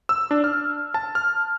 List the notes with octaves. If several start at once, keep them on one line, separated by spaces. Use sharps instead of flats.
E6
D4
F6
A5
F6